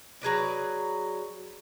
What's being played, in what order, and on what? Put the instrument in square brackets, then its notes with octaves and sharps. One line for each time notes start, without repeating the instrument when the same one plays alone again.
[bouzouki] F#3 G#4 B4 D5